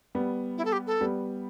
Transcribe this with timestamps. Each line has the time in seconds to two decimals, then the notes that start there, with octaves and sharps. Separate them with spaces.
0.15 G3 B3
0.57 E4
0.65 A4
0.72 G4
0.86 A4
1.01 G3 B3